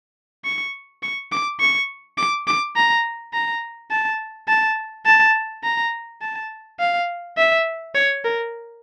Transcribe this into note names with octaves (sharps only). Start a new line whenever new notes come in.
C#6
C#6
D6
C#6
D6
D6
A#5
A#5
A5
A5
A5
A#5
A5
F5
E5
C#5
A#4